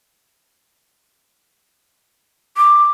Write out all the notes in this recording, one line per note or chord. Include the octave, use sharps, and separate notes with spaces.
D6